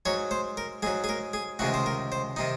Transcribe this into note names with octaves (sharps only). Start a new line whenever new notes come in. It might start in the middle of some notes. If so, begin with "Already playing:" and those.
G#2 F#3 C#5
C5
A#4
G#2 F#3 G#4
G#4
A#4
G#4
C#2 C3 D#3 G#3 F#4
C5
A#4
C5
C3 D#3 D#4